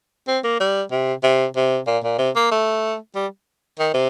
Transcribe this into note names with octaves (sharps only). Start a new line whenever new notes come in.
C4
A#3
G3
C3
C3
C3
A#2
A#2
C3
A#3
A3
G3
D#3
C3